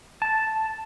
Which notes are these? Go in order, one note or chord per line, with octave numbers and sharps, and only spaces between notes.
A5